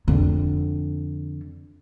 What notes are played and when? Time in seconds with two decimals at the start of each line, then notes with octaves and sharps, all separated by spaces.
0.08 F2 D3